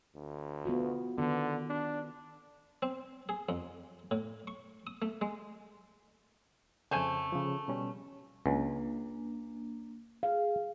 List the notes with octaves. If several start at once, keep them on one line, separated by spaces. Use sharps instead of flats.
D2
B3 F4 F#4
D3 D#3 B3
D4
C4
G#4
F2
A2
C#6
D#6
A3
G#3
F2 C#3 A3 C5 G#5
C#3 F3
B2 G3 C#4
C#2 A#3 D4
G#4 F5